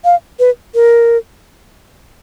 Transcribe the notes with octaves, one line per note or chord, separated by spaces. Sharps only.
F5
B4
A#4